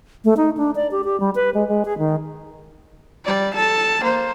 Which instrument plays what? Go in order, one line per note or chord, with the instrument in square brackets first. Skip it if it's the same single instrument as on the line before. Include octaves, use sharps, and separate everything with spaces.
[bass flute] A3
D#4
D4
D5
G4
G4
G3
B4
G#3
G#3
G#4
D#3
[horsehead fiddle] G3 D5
A4 A5
A#3 C5